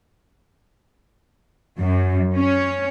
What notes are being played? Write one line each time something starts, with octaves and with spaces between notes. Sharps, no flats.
F#2
C#4